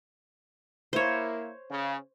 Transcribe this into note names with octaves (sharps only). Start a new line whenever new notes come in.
A#3 E4 C5 C#5
C#3